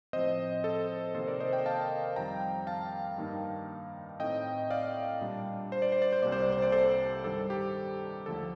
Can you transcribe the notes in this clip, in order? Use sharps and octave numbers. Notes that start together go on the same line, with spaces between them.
A2 F3 C4 C5 D#5
A4
C3 D#3 A#3 A4 C5
A#4 D5
C5 D#5
D#5 G5
F5 A5
F2 D#3 G3 G5 A#5
F5 A5
G2 D#3 A#3 D#4
A2 A3 C4 D#4 D#5 G5
D5 F5
A#2 G3 D4
C5
D5
C5
D5
C5
C2 C3 G3 A#3 D5
C5
D5
C5
D5
A4 C5
G2 D#3 G3 D4 A4
G4
D#2 D3 F3 A3 A4